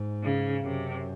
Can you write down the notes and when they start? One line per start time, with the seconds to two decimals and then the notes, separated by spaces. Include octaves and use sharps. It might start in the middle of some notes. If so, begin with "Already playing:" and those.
Already playing: G#2
0.24 C#3
0.64 F#2 C3